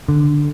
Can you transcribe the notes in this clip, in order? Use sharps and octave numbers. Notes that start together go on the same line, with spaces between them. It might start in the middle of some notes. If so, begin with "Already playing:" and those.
D3